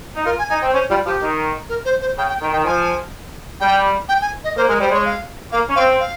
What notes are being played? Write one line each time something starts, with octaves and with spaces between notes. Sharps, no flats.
D#4
F4 A#4
G#5
D#4 G#5
C4 G5
C#4 C5
G3 F4
F3 G4
D#3
A#4
C5
C5
C#3 G5
G5
D#3 G5
D#3 G5
F3 G#5
G3 G5
G5
G#5
D#5
A#3 C5
G#3 A#4
G3 C5
G#3 C#5
F5
A#3 F5
C#4
C4 F5
F5